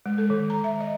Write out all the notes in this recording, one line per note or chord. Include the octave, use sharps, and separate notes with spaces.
G#3
A4
D#3
A#5
E5
D#5